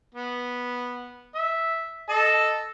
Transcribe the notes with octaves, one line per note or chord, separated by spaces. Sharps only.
B3
E5
A4 D#5 A5